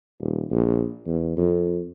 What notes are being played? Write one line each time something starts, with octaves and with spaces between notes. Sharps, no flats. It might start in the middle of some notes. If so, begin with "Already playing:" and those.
D#1
A#1
E2
F2